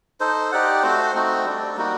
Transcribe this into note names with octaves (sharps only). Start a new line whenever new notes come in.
D#4 A4 C5
D#4 G4 D5 F#5
A3 C4 F#4 C5
A3 C4 D#4 F#4
G3 D4 A4 D5
G3 A#3 D#4 F#4